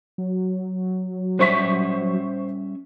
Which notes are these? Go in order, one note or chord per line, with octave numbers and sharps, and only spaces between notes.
F#3
G3 C#4 C5 E5 C#6 B6